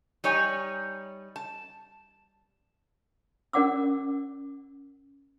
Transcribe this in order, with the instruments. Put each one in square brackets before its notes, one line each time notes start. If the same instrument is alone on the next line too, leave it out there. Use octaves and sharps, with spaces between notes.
[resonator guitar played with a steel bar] G3 D#4 C#5 G#5
A5
[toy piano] C#4 A#4 D5 F#5 D6 E6